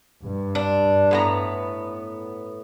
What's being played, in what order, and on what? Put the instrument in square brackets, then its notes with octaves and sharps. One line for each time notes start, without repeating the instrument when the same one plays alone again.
[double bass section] G2
[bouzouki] D4
A2 B3 A#5